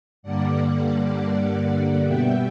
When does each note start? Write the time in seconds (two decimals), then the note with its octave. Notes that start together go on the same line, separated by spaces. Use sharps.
0.23 G2 D3 G3 A#3 D5 F#5
2.05 B2 G3 B3 E5 G5